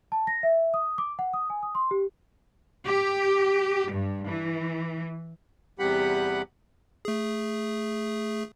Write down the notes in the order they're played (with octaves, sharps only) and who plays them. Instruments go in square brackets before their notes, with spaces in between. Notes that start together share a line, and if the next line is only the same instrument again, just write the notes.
[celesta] A5
A#6
E5
D#6
D6
F#5
D#6
G#5
D#6
C6
G4
[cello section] G4
G2
E3
[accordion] E2 C3 G3 G4 F#5 B5
[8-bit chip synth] A3 G#4